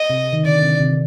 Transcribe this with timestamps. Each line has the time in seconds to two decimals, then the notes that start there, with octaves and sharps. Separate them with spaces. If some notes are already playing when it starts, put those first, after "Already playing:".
Already playing: D#5
0.10 C3
0.33 D#3
0.45 D3 D5
0.62 C3
0.80 C3